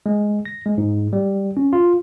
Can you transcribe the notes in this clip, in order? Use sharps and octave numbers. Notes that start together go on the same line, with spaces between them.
G#3
A#6
G#3
G#2
G3
C#4
F4